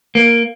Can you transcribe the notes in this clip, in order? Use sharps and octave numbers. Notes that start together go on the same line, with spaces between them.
A#3